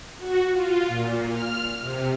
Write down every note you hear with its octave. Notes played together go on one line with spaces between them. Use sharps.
F#4
F4
A#2
F6
C3